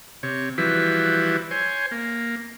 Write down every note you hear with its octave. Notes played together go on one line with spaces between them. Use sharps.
C3 C#5
E3 F3 G3 E4 F#4 B4
C5 C#5 G#5
A#3